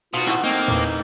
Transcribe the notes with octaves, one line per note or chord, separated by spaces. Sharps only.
D2 B2 D#4 F4 F#4 F5 D#6
C3 E4 F#5
A3 A#3 C4 D#4
E2 A#2